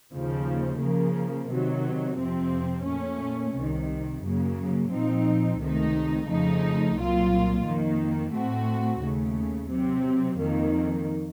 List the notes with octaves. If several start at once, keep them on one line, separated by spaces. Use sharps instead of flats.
D#2 C#3 F3
C#3 F3 A#3
C3 D#3 F#3
F2 C3 F3 C4
A#2 A3 C#4
C2 C3 D#3
F#2 C#3 F#3 A#3
A#2 F3 C4 D#4
C#2 C3 D#3 A3 D#4
F2 C#3 F3 A3 D#4
C2 A#2 F#3 A#3 F4
F2 D#3 A#3
A2 A3 C4 F#4
D#2 C#3 A3
C3 F#3 C4
F2 D#3 A#3